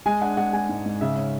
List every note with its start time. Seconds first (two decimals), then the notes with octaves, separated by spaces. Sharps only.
0.06 G#3 G#5
0.21 D4 F#5
0.37 G#3 F#5
0.53 G#3 G#5
0.69 G#2
0.86 G#2
1.01 C#3 E5
1.17 C#4